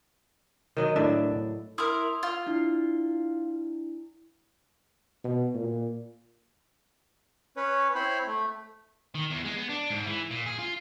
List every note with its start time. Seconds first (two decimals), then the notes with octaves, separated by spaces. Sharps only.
0.77 D#3 F#3 D#5
0.96 A2 D4 E5
1.78 E4 A#4 C6 D#6 E6
2.23 F4
2.47 D4 E4
5.24 B2
5.54 A#2
7.57 C#4 B4 C#5
7.95 C4 E4 C5 C#5 B5
8.27 A3
9.15 D#3
9.30 E2
9.45 G#3
9.57 B3
9.69 D4
9.91 G#2
10.06 E3
10.31 A#2
10.46 G#4
10.59 F4